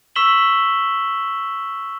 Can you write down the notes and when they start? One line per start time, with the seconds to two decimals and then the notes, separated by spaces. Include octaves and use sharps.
0.16 C#6 E6 B6 E7 F#7 G7